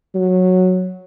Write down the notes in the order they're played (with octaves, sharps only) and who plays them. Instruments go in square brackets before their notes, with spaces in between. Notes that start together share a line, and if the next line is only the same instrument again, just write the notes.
[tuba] F#3